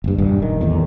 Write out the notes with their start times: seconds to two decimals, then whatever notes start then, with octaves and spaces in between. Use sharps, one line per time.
0.04 F#1 G2
0.18 D#1 G2
0.42 D#3
0.61 E2 A2 D#3